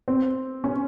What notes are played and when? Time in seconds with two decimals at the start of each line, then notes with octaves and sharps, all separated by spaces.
0.08 C4
0.64 C#4